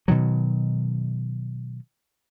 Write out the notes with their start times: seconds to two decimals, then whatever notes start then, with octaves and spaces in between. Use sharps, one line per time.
0.08 B2 D#3 F#3